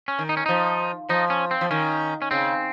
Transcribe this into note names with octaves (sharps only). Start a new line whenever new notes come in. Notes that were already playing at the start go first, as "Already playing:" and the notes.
C#4
D#3
D#4
C#4
F3 D#4
F3 D#4
C#4
C4
F3
D#3 C#4
C#4
C#3 C4